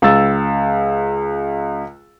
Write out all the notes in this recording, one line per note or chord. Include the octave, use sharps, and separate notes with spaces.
C#2 E6 A6